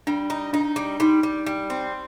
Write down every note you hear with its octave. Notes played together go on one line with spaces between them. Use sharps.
G3 D4
D#4
D4 D#4
G3
G3 D#4
G3
G3
C4